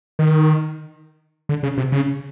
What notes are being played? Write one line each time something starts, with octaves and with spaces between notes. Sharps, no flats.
D#3
D3
C#3
C3
C#3